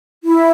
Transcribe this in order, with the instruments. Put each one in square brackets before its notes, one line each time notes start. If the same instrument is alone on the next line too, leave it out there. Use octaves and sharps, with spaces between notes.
[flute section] E4